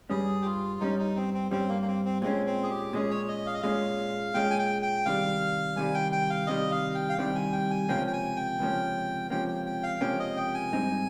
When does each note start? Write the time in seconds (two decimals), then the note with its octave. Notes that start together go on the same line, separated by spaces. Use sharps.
0.10 G2 G3 C#4 G#4
0.42 G4
0.46 F4
0.80 G2 G3 C#4 D#4
0.99 D#4
1.16 C4
1.34 C4
1.51 G2 G3 C4 C#4
1.69 A#3
1.82 A#3
1.88 C4
2.05 C4
2.22 A#2 G#3 C4 C#4
2.46 C4
2.63 G#4
2.70 G4
2.93 A#2 G#3 C#4 G#4
3.10 C#5
3.28 D#5
3.46 F5
3.54 D#5
3.62 A#2 G#3 C#4 F5
4.34 A#2 G#3 C#4 G5
4.51 G#5
4.59 G5
4.82 G5
5.05 C2 C3 D#3 G3 F5
5.76 C2 C3 D#3 G3 G#5
5.94 G5
6.12 G5
6.30 F5
6.47 C2 C3 D#3 G3 D#5
6.71 F5
6.95 G5
7.09 F5
7.18 C2 C3 D#3 G3 G5
7.35 G#5
7.53 G5
7.71 G#5
7.89 C#2 C3 F3 A#3 C#4 G5
8.07 G5
8.13 G#5
8.36 G5
8.59 C#2 C3 F3 A#3 C#4
9.30 C#2 C3 F3 A#3 C#4 G5
9.48 G5
9.66 G5
9.83 F5
10.01 C#2 C3 F3 A#3 C#4 G5
10.19 D#5
10.37 G5
10.54 G#5
10.72 G#2 G3 C4 D#4